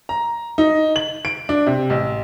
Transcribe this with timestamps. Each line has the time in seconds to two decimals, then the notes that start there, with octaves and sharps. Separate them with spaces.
0.09 A#5
0.58 D#4
0.96 F#7
1.25 D7
1.49 D4
1.66 C3
1.90 A1